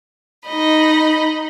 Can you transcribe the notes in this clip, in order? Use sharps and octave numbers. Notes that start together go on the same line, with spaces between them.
D#4 D#5 B5